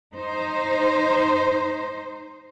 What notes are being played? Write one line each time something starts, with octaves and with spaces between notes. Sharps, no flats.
D#4 C5